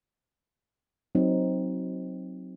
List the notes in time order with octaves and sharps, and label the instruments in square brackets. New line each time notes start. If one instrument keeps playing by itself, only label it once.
[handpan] F#3 C4 D#4